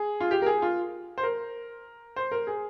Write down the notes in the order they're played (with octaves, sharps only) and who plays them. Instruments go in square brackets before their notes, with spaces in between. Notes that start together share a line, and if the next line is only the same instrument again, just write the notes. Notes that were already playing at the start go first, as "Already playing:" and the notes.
Already playing: [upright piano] G#4
F4
G4
A#4
G#4
F4
C5
A#4
C5
A#4
G#4